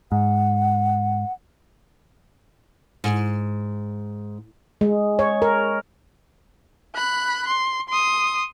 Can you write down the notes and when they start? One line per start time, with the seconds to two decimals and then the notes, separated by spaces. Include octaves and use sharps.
0.12 G#2 F#5
3.04 G#2
4.81 G#3
5.19 C#5
5.42 A#4
6.96 B5 F#6
7.48 C6
7.89 C6 D#6